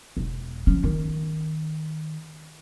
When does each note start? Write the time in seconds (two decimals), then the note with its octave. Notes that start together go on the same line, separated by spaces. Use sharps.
0.17 E1
0.67 F3 C#4
0.84 D#3